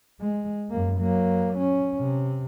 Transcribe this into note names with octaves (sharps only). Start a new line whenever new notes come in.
G#3
F#2 A#3
F#3 A#3
C#4
C3